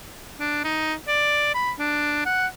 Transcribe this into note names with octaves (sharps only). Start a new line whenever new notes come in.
D4
D#4
D5
B5
D4
F#5